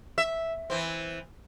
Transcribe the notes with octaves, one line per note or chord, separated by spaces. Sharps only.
E5
E3 C4